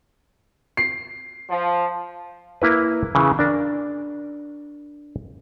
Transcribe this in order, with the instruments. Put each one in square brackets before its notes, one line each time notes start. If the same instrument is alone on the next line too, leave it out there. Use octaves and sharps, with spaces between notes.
[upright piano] C7
[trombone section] F3
[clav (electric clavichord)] A#3 E4 B4
C#3 E3
D4 A#4